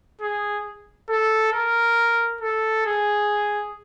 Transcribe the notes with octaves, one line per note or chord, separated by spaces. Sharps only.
G#4
A4
A#4
A4
G#4